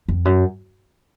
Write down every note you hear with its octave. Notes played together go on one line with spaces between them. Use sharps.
F2
F#2